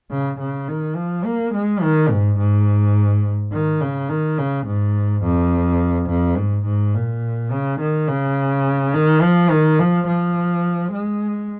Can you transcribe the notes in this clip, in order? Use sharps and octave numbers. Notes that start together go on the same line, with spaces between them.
C#3
C#3
D#3
F3
A#3
G#3
D#3
G#2
G#2
D#3
C#3
D#3
C#3
G#2
F2
F2
G#2
G#2
A#2
C#3
D#3
C#3
D#3
F3
D#3
F3
F3
G#3